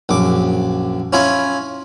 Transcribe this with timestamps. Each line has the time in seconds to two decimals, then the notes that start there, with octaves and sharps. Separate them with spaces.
0.09 A#1 F#2 D6
1.13 C#4 E4 F4 E5 G#5